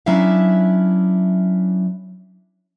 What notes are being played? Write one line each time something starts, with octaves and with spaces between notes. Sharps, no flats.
F#3 C#4 D4 E4 E5 F5